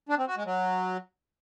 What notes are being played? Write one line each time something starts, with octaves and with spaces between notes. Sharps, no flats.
D4
C4
F#4
G#3
F#3